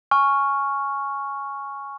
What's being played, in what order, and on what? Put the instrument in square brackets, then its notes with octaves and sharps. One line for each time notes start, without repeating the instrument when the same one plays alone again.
[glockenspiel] G#5 C#6 F6